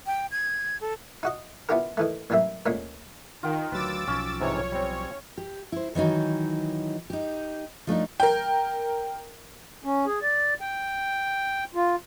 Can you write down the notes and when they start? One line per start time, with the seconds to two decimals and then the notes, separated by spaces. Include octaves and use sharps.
0.06 G5
0.31 G#6
0.81 A4
1.23 D#4 F#4 D#5
1.69 B3 D4 E4 F4 G4 A#4
1.97 D#3 E3 A3
2.30 A1 F#2 G3 A#3 E5
2.66 D2 A#2 G#3 A#3 C#4
3.43 D#3 F4 G5
3.72 D2 F#3 B4 D6 E6 A6
4.07 B1 F3 C#4
4.41 G#2 C3 E3 C#5
4.72 G3 C4
5.38 G4
5.72 E4 C5
5.95 D#3 E3 F#3 D#4
7.10 D#4 G4
7.87 F3 A3 D4 D#4
8.20 A#4 G5
9.84 C#4
10.06 G#4
10.22 D5
10.61 G5
11.75 F4